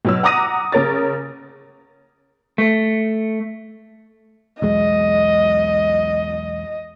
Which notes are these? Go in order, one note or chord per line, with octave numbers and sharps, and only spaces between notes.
B2 F#3 E6
F#5 A#5 D6 D#6 A#6 D#7
C#3 A#4 C#5 A6
A3
B1 E2 G#3 D#5